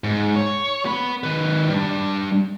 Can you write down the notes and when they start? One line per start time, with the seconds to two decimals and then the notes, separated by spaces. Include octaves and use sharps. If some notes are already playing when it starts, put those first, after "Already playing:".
0.04 G#2
0.36 C#5
0.86 B3 B5
1.24 D#3 B4
1.70 G3 D4